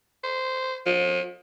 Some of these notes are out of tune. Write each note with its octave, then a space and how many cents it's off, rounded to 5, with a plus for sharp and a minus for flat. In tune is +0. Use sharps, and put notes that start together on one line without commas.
C5 -10
F3 +35